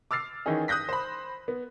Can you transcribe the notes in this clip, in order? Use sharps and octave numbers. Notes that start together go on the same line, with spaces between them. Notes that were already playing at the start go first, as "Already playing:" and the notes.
D6 E6 F6 A6 C7
D#3 E3 C#4 D#4 G#4 D#5
D#6 F#6 G6 A#6 B6
C5 B5
B3